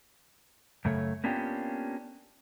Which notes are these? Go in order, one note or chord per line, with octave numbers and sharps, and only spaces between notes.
F#2 C#3 A3 A4 C#5
A#3 B3 C#4 D4 F4 G4